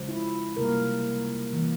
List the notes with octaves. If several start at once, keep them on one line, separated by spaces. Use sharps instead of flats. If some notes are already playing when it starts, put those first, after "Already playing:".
Already playing: C#3 F3 G#3
E4
C3 G3 A#3 A#4
E3 A#3